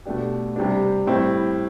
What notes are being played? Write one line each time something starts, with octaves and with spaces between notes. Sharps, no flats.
B2 A3 D4 G4
C3 G3 D4
A2 G3 C4 E4